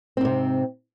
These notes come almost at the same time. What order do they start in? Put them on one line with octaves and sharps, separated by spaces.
C4 G#2 C3